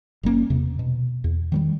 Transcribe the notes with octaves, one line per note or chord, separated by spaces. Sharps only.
F#1 G3 A#3 C#4
E2 C3
B2
E2
D#3 F#3 G3